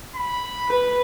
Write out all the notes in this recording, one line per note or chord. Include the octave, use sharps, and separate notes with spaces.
B5
B4